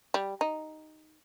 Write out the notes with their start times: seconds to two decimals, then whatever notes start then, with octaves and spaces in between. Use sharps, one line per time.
0.14 G3
0.41 D#4